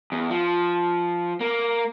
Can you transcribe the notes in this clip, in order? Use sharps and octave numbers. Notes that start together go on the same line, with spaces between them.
E2
F3
A#3